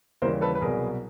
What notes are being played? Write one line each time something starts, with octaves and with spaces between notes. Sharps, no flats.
D#2 C#3 E3 G3 A#4 C5
A4 B4
B4
C2 B2 F#3 G#4 A#4